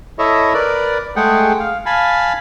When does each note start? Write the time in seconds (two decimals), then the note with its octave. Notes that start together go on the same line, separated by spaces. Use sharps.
0.19 E4 A4 C#5 D#5 E5
0.54 A#4 B4 D5
1.16 G#3 A3 G#4 F#5 G5
1.60 F5
1.86 F5 G#5 A5 B5